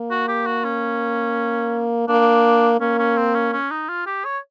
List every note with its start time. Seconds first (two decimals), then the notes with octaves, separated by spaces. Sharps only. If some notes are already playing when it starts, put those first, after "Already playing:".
Already playing: A#3
0.11 F#4
0.28 G4
0.46 F#4
0.64 C#4
2.09 A#3 D4
2.81 A#3 C#4
2.99 C#4
3.17 C4
3.34 C#4
3.53 C#4
3.71 D#4
3.89 F4
4.06 G4
4.25 C#5